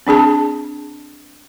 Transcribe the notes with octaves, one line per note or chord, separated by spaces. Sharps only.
C4 D4 G#4 A5